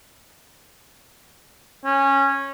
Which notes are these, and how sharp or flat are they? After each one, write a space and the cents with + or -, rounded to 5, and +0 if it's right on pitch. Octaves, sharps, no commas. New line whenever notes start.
C#4 -15